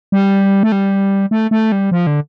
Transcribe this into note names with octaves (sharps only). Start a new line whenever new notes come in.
G3
A3
G3
A3
A3
G3
F3
D3